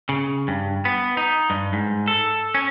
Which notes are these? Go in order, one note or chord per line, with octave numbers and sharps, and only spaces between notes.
C#3
G2
B3
D#4
G2
G#2
A4
C#4